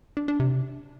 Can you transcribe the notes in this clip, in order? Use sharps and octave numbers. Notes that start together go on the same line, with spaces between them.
D4
D4
C3